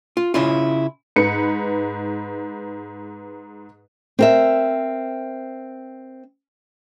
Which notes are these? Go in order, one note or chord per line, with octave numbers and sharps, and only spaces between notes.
F4
C#3 C#4 E4 F4
G#2 B4 C#7
C4 A#4 E5